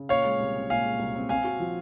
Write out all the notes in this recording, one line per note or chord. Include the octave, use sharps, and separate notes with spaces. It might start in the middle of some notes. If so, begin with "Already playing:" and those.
Already playing: C#3
A#2 C#5 F5
G#3
C2
C4
A#2 F5 G#5
G#3
C2
C4
C4 F5 G#5
F#4
F3